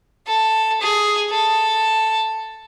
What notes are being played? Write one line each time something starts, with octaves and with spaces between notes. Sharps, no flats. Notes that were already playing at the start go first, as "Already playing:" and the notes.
A4
G#4
A4